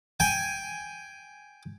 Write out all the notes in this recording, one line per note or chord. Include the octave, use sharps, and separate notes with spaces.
G5 G#5